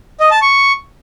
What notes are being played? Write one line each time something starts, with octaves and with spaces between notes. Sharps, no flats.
D#5
A5
C#6